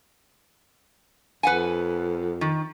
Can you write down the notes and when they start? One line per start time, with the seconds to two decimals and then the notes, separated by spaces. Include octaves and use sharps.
1.43 F2 B4 F#5 G#5
2.41 D#3